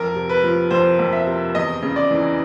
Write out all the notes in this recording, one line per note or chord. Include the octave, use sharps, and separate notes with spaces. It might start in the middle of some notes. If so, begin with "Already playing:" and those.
Already playing: F2 A#4
C3
B4
F3
F2 C5
F2
E5
C3
E2 D#5
C#3
D5
E3